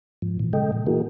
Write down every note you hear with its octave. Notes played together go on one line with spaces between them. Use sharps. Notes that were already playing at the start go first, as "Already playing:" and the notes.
G#2 F3
A#2 E3
C#3 G#3 A4 D#5 G5
A#2
E3 A#3 E4 F#4 G#4 A#4